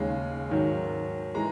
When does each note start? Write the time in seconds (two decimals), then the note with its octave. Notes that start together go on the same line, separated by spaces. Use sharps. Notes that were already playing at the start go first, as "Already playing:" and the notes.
Already playing: D#2 C#3 G#3
0.49 G#2 D#3 F#3
1.35 E3 G#3 A#5